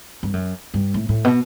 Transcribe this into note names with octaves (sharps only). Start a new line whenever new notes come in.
G2
F#2
G2
A2
A2
B2